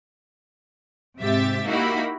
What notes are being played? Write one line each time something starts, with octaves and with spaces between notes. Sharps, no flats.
G#2 C3 G4 E5 A6
A#3 D#4 E4 F#4 G4 B5